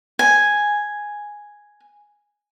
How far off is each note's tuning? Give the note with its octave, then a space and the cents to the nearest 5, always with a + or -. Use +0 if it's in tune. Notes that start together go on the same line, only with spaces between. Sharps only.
G#5 +0